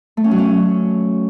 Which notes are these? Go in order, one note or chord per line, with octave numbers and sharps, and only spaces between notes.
A3
C#4
F#3
C#4